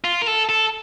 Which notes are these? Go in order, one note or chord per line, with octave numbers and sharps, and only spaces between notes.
F4
A#4
A4
A4